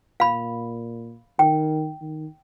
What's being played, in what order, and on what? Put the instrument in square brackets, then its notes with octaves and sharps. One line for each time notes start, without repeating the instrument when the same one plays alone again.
[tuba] A#2 [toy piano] F5 B5
[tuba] D#3 [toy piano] G5
[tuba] D#3